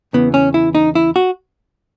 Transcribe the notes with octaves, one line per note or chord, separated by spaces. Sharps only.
E2 C#3 E3 B3
C#4
E4
D#4
E4
F#4